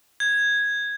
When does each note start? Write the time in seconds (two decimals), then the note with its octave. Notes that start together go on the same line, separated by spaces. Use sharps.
0.20 G#6